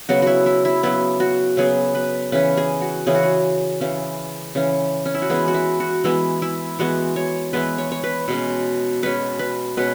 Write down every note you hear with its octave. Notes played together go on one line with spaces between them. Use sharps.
C#3 F#3 B3 F#4
E4 F#4
E4
E4
C#3 F#3 B3 E4
F#4
C#3 F#3 B3 G#4
B4
C#3 E3 C#4 B4
G#4
F#4
C#3 E3 C#4 G#4
F#4
G#4
C#3 E3 C#4
C#3 E3 C#4
C#4
E4
F#4
E3 G#3 B3 G#4
F#4
E4
F#4
E3 G#3 B3 E4
E4
E3 G#3 B3 F#4
C#5
E3 G#3 B3 B4
C#5
C#5
B4
B2 G#3 C#4
B2 G#3 C#4 B4
B4
B2 G#3 C#4 B4